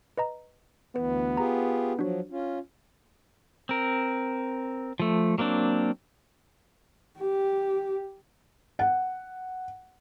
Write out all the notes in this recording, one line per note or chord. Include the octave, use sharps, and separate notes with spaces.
B4 D#5 A#5
D2 E3 B3 B4
F4 G4 G#4 A#5
F3 F#3 D4 F#4
C#4 F4
C4 A#4
F3 A3
F#3 A#3 C4 D4
G4
F#5